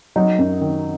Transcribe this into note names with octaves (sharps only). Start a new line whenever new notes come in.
F#3 D#4
F#2
D#3